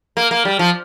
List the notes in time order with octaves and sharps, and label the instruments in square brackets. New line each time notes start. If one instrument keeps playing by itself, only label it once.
[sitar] A#3
A#3
G3
F3